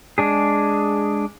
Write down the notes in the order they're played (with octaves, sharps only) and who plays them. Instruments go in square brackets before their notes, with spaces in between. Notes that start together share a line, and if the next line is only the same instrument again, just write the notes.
[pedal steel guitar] G#3 D4 G#4